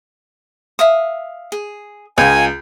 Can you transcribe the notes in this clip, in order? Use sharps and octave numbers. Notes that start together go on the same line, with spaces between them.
E5 F5 D#6
G#4
C#2 F4 D#5 G#5